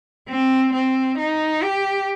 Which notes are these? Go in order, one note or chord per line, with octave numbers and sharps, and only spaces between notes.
C4
C4
D#4
G4